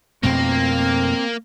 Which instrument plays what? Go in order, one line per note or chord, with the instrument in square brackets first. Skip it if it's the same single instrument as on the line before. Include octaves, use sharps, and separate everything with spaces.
[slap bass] F2 B2 A3 [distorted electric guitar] A#3 [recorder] C4